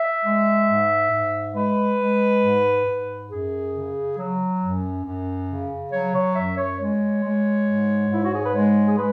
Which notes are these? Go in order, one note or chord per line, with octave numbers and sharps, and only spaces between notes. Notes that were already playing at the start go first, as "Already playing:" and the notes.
Already playing: E5
G#3
G#2
G#2
G#3 B4
G#3
G#2
G#2
F#2 G#4
C#3
F#3
F#2
F#2
C#3
F#3 C#5
C#5
F#2 E5
C#5
G#3 C#5
G#3
G#2
G#2 E4
F#4
G#4
B4
G#3 C#5
G#4
G#3 B4